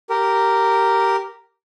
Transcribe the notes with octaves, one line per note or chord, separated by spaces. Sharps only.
G4 A#4